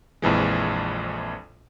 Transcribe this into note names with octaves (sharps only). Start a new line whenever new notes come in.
A#1 F2 E3 G#3